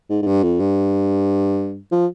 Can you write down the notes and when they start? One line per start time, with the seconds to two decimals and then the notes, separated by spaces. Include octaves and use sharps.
0.10 G#2
0.22 G#2
0.27 G2
0.43 F2
0.60 G2
1.92 F3